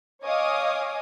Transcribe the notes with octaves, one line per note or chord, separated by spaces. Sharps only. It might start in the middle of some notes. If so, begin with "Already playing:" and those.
C#5 D#5 F5 G#5 D6 D#6